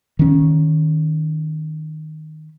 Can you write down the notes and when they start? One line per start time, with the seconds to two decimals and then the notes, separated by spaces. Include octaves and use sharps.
0.19 D#3 C#4